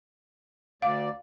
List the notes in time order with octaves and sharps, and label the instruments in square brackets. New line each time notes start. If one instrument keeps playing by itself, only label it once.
[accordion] D2 D5 [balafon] F5